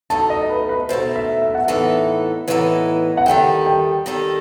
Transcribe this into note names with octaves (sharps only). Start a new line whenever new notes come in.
B2 A3 D#4 A5
D#5
B4
B4
B2 A3 D#4 C5
E5
E5
F#5
A2 E3 B3 D#4 A4 E5
A2 E3 B3 D#4 A4
F#5
D#3 G3 D#4 A4 G5
G5
D#3 G3 D#4 A4